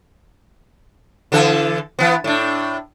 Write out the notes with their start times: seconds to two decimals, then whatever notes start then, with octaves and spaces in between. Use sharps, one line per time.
1.32 D3 E3 A4
1.99 E3 B3
2.24 A2 D4